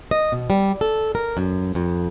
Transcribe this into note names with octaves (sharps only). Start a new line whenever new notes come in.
D#5
B2
G3
A4
A#4
F#2
F2